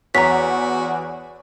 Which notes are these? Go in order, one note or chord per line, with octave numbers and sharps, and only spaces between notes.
E2 F#4 C#5 A#5 B6